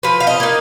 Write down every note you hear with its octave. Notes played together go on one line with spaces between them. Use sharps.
F3 B4
F5
D#5
A#3 D#4